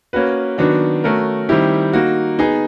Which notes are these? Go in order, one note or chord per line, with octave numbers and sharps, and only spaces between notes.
A#3 C#4 F#4 B4
D#3 F#3 B3 D4 F#4
A3 C#4 F#4 A#4
D#3 G3 C4 E4 G4
A#3 D#4 F#4
B3 D#4 G#4